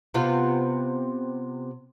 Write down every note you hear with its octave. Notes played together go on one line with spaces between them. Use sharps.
C3 B3 F4